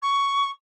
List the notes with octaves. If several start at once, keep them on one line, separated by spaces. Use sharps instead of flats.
C#6